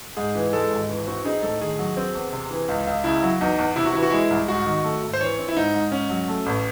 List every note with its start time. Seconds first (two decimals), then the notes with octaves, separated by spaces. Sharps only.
0.17 G#2 G#4
0.35 E3
0.53 G#3 A4
0.71 G#1
0.89 E3
1.07 C4 F#4
1.25 D#4 G#4
1.42 A2 A4
1.61 D#3 G#4
1.79 F#3
1.97 C4
2.15 E2
2.33 C3
2.51 E3
2.68 C#2
2.87 C#2
3.04 C#3 E4
3.23 F#3
3.41 E2 D#4
3.59 E2
3.76 C3 E4
3.85 F#4
3.94 E3 E4
4.03 F#4
4.11 G#3 E4
4.30 C2
4.48 G#2 F#4
4.66 D#3
4.84 A3
5.02 G#1
5.13 C5
5.20 E3 C#5
5.38 C4
5.48 E4
5.56 G#2 D#4
5.74 G#2
5.92 G#2 C#4
6.10 F#3
6.28 A3
6.46 A1